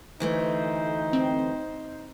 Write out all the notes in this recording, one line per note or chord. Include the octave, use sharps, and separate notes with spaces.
D2 E3 A3 D#4 C5
C4